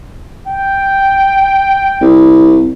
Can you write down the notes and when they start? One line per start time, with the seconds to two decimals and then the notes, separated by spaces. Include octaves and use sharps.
0.48 G5
2.01 C2